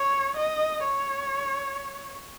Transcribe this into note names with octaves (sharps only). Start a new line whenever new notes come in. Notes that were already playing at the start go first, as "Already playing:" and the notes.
Already playing: C#5
D#5
C#5